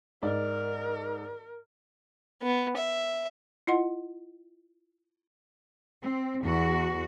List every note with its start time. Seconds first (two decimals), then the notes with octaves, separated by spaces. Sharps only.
0.23 G#2 A#4 D5
2.43 B3
2.77 E5
3.67 E4 F4 D#5 F#5 C6
6.02 C4
6.42 E2 F#4